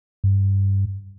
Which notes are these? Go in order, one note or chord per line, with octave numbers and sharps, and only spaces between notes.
G2